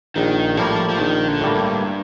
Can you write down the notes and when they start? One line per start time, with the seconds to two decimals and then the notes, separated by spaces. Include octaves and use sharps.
0.16 A#1 D#3
0.57 A2 F3 G3 A#3
0.89 F3
0.99 A#1 D#3
1.28 D3
1.41 A2 G3 A#3
1.55 G2